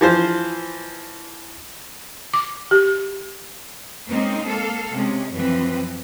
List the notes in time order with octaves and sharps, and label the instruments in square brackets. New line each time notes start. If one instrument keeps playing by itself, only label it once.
[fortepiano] E3 F3 C5
[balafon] D6
G4
[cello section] G#3 A#3 C4 C#4 D#4
A#3 A4 F5
C3 G#3 C#4
F#2 E3 F3 C4 B4